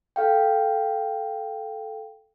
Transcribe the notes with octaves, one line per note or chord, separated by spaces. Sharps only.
A4 F5 G5